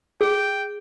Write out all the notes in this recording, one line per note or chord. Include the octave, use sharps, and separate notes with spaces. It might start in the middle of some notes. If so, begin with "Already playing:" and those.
G#4 G5